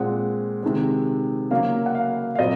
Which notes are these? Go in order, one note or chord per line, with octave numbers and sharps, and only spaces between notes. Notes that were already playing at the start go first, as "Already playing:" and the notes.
Already playing: A#2 G#3 C4 F#5
C3 D#3 G#3 C4
C#3 F#3 A#3 F5
F#5
F5
F5
A#2 F#3 C4 D#5